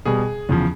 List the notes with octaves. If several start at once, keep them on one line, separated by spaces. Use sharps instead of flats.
B2 G3 G#4
E2 C#3 F3